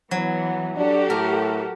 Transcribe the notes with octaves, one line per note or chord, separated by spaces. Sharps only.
E3 F#3 B3
D4 F#4 G4 A4
A2 A#4